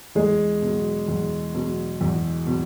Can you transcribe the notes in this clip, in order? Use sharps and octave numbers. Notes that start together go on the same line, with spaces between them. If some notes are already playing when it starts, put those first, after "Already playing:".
E2 G#3
B2 F#3
E2
B2 F#3
E2
B2 F#3